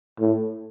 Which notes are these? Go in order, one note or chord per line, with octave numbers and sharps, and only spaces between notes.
A2